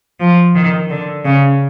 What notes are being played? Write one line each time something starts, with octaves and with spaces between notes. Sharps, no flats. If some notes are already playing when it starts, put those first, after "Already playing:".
F3
D#3
D3
C#3